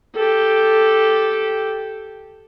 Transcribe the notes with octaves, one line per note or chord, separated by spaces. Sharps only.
G4 A4